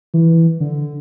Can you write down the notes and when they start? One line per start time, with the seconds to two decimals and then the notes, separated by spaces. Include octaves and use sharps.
0.14 E3
0.60 D3